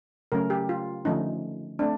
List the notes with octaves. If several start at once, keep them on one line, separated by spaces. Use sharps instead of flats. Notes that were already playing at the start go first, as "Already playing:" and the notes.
C#3 F#3 A3 C#4 A#4
G4
F4
D3 F3 A3 C#4 D#4
A3 C4 D4